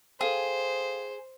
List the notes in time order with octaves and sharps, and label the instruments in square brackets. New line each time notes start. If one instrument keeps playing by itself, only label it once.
[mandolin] G#4 [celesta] A4 F5 G5 [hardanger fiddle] C5